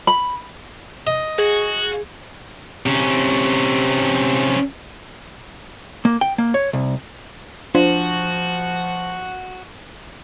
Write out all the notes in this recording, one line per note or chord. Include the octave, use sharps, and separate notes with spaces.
B5
D#5
F#4 G#4
C3 C#4
A#3
G5
A#3
C#5
C2
F3 D4 F4 F#4 C5